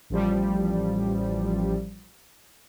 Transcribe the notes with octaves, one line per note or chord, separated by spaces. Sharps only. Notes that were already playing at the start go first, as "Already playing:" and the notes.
A1 F3 G3